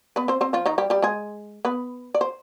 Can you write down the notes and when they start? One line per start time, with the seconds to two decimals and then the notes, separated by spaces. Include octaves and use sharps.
0.16 B3 B4
0.28 C4 C5
0.41 C4 C5
0.53 F3 F4
0.66 D#3 D#4
0.78 G3 G4
0.90 G3 G4
1.02 G#3 G#4
1.65 B3 B4
2.14 D5
2.21 C5